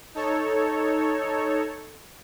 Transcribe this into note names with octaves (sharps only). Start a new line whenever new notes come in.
D#4 A4 C#5